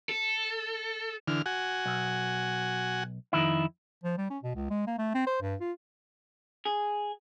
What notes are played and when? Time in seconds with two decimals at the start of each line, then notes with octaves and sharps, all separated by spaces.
0.09 A4
1.28 D3 E3 F6
1.46 F#4 F#5 G#5
1.86 B1
3.33 F2 D#3 E4
4.04 F3
4.18 G3
4.30 C#4
4.43 B2
4.55 C#2
4.70 G#3
4.87 A#3
4.98 A3
5.15 C4
5.27 C5
5.42 G2
5.61 F4
6.65 G#4